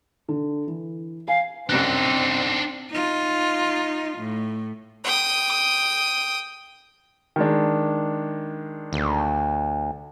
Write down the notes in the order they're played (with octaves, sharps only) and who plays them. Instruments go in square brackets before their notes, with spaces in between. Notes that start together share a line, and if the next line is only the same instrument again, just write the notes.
[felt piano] D3
E3
[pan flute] F5 [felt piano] G#5
[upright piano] C2 F#2 F#6 [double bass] C4 [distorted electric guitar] D4 D#4
[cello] D#4 F4
A2
[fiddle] G5 D#6
[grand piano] D#3 G#3 D4
[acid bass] D2